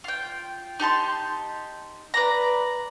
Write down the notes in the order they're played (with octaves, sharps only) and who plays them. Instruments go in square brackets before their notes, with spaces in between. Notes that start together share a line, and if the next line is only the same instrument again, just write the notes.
[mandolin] F4 G5
D#4 G4 A5 C6
B4 D5 A#5